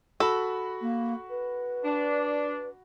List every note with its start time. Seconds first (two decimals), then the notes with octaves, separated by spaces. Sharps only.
0.20 F#4 A4 B5
0.81 A#3
1.30 B4
1.84 D4